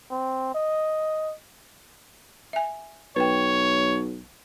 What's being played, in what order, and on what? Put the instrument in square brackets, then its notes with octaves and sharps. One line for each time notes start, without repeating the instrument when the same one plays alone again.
[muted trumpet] C4
D#5
[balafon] E5 G#5
[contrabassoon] B1 [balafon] B4 G5 [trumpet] C#5